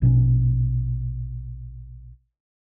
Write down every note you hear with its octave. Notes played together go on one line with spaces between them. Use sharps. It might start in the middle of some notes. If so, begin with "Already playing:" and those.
A#1 B2 C#4